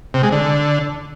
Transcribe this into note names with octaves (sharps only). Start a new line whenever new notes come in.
C3
G#3
D3